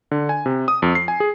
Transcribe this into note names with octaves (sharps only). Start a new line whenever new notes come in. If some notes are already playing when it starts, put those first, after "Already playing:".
D3
G#5
C3
D#6
F2
C7
G#5
G#4